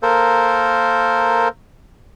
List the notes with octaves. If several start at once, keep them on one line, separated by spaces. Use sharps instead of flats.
A#3 A4 A#4 C5